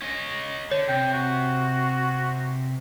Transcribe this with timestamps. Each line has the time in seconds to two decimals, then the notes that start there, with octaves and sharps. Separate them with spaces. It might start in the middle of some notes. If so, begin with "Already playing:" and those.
0.03 C#4 D#5
0.71 D3 C#5
0.88 C3 G5
1.13 F#4